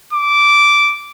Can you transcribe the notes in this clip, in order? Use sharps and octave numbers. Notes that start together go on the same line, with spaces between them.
D6